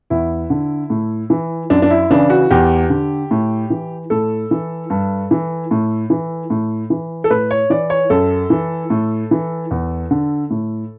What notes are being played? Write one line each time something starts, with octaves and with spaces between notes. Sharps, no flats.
E2 E4
D3
A2
E3
F#2 D4
D4
E4
C#3 E3 D4
F#4
E2 G4
D3
A2
E3
A2 A4
E3
G2
E3
A2
E3
A2
E3
A4
A2 B4
C#5
E3 D5
C#5
F#2 A4
E3
A2
E3
E2
D3
A2